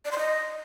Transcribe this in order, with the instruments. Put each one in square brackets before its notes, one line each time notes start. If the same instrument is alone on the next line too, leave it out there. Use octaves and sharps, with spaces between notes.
[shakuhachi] D5
C6
D#5